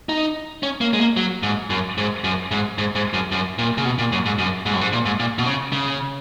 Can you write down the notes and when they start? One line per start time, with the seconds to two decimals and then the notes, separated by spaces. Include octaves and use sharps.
0.09 D#4
0.63 C#4
0.81 A#3
0.93 G#3
0.99 A#3
1.17 F#3
1.43 G#2
1.70 F#2
1.98 G#2
2.24 F#2
2.51 G#2
2.78 G#2
2.95 G#2
3.13 F#2
3.32 F#2
3.59 A#2
3.78 C#3
3.85 B2
3.99 A#2
4.12 F#2
4.26 G#2
4.39 F#2
4.66 G#2
4.74 F#2
4.81 G#2
4.93 A#2
5.06 G#2
5.20 A#2
5.38 B2
5.46 C#3
5.73 C#3